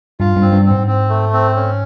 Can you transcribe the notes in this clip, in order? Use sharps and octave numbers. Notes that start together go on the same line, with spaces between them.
G2 F4
G2
C4
G2
C4
G#2
C4
A3
C4
C#4